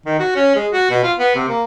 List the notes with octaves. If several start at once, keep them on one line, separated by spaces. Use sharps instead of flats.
D#3
F#4
C#4
G#3
F#4
B2
F4
B3
C3
A#3